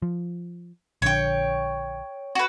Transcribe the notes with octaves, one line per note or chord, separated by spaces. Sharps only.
F3
A#1 D3 C#5 G5
F#4 B4